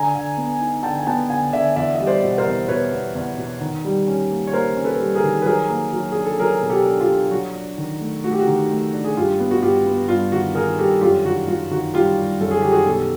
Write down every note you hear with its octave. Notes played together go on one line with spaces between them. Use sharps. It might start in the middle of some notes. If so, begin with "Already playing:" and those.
Already playing: D3 G#5 A#5
D3
B3
D#4
D3 G5 A5
G#5
B3 G5 A5
D3 F#5 G#5
D3 D5 E5
E2 D5 E5
G3 D#5
C5 D5
B2
A#4 C5
E2
B2 B4 C#5
E2
E2
B2
D#3
G3
C#4
A#3
C#5
A#3 A#4 C5
C#4
A4 B4
G3
G#4 A#4
D#3
B4
F#3 G#4 A#4
A#3
F#3
D4 G#4
A4
F#3 G#4 A#4
B2
G4 A4
D4
F4 G4
D4
F#3 F#4
D4
D#3
A3
A3 F#4
G4
F#4
D#3
A3
D4
G#4
G2 F4 G4
B3
F#4
G2 F4 G4
B3
G2 F4
D#3 F#4
D#3 G#4 A#4
G2 G4 A4
F#2 F4 G4
D#3 F#4
F#2 F4
D#3 F#4
G3 F4 G4
G3
F#2 A4
G#4
D#3 G4
F#4 G#4
B2 G4 A4